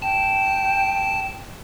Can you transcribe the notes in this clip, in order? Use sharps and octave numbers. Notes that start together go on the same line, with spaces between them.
G5 A5